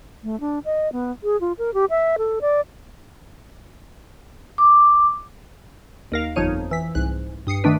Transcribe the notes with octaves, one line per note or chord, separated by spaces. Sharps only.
A3
D4
D#5
B3
G#4
F4
A#4
G4
E5
A4
D5
D6
D#2 A#4 F5
G1 F2 F3 D#4 C#5 D#7
E3 B6
C2 G#2 F#6
G2 D#6 C7 C#7
D#3 A3 D4 B4